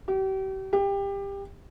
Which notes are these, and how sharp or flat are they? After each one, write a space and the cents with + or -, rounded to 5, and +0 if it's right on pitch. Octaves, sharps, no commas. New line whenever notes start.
G4 -40
G4 +20